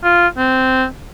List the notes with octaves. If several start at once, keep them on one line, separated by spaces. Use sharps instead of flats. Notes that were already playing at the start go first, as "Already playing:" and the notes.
F4
C4